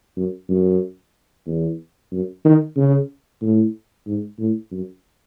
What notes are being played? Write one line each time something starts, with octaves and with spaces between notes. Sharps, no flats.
F#2
F#2
E2
F#2
D#3
C#3
A2
G#2
A2
F#2